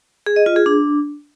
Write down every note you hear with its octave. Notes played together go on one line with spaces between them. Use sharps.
G#4
D#5
F4
G#4
D4